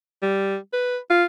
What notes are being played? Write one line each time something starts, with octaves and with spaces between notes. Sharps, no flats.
G3
B4
F4